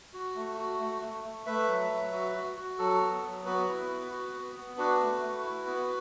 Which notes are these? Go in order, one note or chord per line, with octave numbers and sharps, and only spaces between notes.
F#4
A3
F#4
A3
A3
A3
A3 B4 E5
F#3
F#3
F#4
F#4
F#4
F#3 A4
B3
F#3
B3 F#4 B4
E4
B3
F#4
B3
B3
D4 F#4 B4
A3
A3
E4
B3